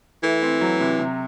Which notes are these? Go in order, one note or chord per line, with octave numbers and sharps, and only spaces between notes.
E3 A3
C4
F#3
C3
C3